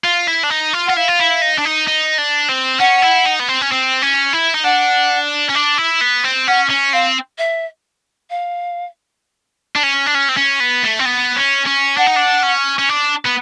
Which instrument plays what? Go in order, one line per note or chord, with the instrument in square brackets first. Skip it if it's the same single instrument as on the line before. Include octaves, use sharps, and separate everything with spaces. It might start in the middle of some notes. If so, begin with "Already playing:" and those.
[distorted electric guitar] F4
E4
D4
D#4
F4
[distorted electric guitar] F4 [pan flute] F#5
[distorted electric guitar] E4 [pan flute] F5
[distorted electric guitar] F4
E4
D#4
D4
D#4
D#4
D4
C4
[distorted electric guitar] C#4 [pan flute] F#5
[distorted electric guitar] E4
D#4
B3
C4
C#4
C4
C#4
E4
D#4
[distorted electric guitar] D4 [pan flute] F#5
[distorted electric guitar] C#4
D4
E4
B3
C4
[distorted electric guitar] C#4 [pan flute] F#5
[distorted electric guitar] C#4
[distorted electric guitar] C4 [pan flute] F5
[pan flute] E5
F5
[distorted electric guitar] D4
C#4
D4
C#4
C4
C#4
B3
A3
C4
B3
C#4
C#4
[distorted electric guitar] D4 [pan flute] F#5
[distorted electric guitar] D#4
D4
C#4
C#4
D4
B3